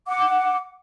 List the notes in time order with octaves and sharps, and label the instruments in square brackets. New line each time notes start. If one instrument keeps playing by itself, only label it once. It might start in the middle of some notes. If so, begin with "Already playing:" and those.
[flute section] F#5 D6